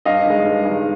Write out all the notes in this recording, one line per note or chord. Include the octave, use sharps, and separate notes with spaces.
G2 D#5 F5
D#3 G#3
G2
D#3 G#3